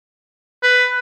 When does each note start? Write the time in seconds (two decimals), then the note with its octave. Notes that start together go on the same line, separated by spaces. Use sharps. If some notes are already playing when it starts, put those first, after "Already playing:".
0.63 B4